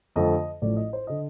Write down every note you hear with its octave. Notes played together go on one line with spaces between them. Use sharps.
F2 D3 F3 A3 D#5
A1 A2 F3 A3 D5
D#5
C5
D3 D#5